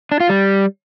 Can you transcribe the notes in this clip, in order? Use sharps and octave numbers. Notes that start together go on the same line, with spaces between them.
D4
F4
G3